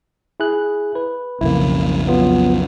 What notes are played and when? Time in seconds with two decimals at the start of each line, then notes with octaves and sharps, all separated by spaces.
0.40 E4 G#4 F#6
0.95 B4
1.41 B1 F2 C#3 A#3 E4
2.07 F#3 B3 F4